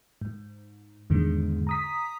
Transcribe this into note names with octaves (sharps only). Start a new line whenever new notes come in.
G#2
E2 G#2 D3 D#3 G#3
A#5 D#6 B6